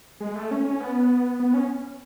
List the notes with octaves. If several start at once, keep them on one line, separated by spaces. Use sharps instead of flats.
G#3
A3
C#4
C#4
B3
B3
C#4